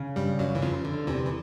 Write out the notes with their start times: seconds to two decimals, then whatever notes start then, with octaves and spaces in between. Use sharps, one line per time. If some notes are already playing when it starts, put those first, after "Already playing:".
Already playing: C#3
0.16 G2 G3
0.39 F#2 F#3
0.55 E3
0.62 F2 C#3 F3
0.85 D3
1.07 E2 C3 E3
1.25 E3